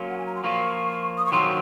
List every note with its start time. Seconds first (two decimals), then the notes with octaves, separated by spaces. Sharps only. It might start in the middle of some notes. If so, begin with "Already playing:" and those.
Already playing: F#3 A#3 C#4 F4
0.10 F#5
0.18 G#5
0.26 A#5
0.36 C6
0.44 F3 A#3 F4 C#6
1.18 D#6
1.26 C#6
1.32 D#3 F#3 C4 F4 C6